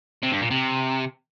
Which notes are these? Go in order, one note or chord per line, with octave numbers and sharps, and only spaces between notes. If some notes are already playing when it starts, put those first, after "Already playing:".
C3
G2
A#2
C3